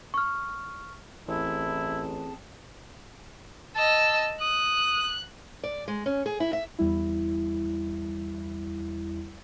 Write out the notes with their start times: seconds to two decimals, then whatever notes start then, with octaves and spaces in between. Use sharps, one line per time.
0.14 C#6 F6
1.28 A1 C4 E4 G#4 A5
3.76 D#5 A5 E6
4.41 D#6 F#6
5.64 D5
5.88 G#3
6.06 C#4
6.26 G#4
6.40 E4
6.53 E5
6.79 E2 G3 E4